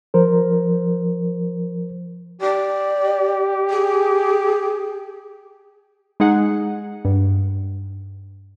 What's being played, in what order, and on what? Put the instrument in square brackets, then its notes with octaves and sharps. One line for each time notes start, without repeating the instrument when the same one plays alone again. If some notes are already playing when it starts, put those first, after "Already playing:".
[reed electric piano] F3 A#4 C5
[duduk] G4 [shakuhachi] D5
[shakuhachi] G#4
[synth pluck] G#3 D#4 G#4 F#5
G2